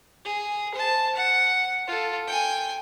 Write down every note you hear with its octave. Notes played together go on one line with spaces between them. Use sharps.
G#4
C5 A5
F#5
F4 A4
G5 G#5